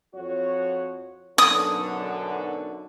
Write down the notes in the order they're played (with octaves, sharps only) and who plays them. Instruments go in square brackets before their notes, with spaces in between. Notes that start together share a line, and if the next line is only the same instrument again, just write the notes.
[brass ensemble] F2 F#4 C#5
[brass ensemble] B1 F#2 D3 [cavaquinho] D#6